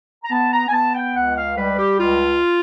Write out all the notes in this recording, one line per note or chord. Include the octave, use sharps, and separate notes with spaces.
A#5
B3 A5
A#5
G#5
B3 A5
G5
C#2 F#5
F5
G3 B4
G4
C#2 F4